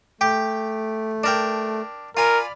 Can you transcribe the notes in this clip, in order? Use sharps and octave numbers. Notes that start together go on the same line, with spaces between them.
A3 G4 G5 D6
D4 A#4 G5
F4 A#4 D5 G#5 B5 F6